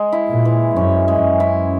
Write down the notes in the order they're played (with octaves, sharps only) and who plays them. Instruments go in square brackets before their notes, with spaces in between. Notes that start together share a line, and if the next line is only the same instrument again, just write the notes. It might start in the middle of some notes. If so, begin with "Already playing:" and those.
Already playing: [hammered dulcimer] G#3
E4
[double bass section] A#2
[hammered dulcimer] E3
[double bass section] F#2 [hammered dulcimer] C#4
[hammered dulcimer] G#3
[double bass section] F#2
[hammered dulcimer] E4